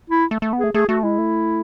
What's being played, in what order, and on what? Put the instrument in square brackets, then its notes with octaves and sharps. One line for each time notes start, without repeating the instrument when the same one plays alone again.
[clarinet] E4
[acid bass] A3
A3
B3
[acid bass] A3 [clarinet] G#4
[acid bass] A3 [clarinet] G#4
[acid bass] A3 [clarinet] F#4
[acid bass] G#3 [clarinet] E4
[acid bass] A3